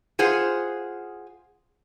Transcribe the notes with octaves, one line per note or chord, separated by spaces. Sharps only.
F4 G#4 C5 F#5